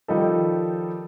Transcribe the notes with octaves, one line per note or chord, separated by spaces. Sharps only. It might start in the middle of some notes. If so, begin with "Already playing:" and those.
D#3 F3 G3 D#4 A4